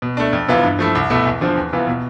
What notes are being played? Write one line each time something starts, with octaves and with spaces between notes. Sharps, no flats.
B2
A3 D4
F2
C3 E3 B3 F4
G2
F3 A3 E4
C2
B2 A3 E4
E2
D3 F3 C4
E2
C3 E3 B3 F4
B2